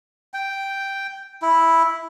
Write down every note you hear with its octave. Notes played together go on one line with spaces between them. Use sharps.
G5
E4